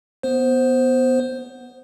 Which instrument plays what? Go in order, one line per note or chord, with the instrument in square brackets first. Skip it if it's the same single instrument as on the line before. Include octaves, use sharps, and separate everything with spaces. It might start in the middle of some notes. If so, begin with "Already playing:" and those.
[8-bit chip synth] B3 C5